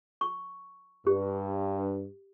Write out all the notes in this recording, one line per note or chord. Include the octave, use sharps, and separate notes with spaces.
C#6
G2 G4